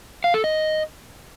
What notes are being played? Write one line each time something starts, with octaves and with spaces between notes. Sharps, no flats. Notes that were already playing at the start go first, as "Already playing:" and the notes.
F5
A4
D#5